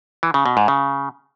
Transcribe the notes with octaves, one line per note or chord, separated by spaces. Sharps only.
E3
C#3
B2
G#2
C#3